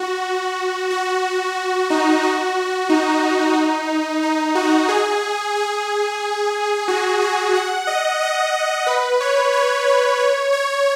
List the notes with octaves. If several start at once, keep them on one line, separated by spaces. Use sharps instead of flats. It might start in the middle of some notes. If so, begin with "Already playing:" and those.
Already playing: F#4
F#4
D#4
F#4
D#4
D#4
F#4
G#4
G#4
F#4
G#4
F#5
D#5
D#5
B4
C#5
C#5
B4
C#5
C#5